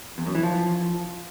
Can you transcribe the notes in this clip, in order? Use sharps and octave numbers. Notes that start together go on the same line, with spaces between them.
E2
F#2
E3
F3